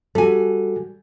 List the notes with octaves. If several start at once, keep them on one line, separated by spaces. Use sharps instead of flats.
G3 F#4 A4 G#5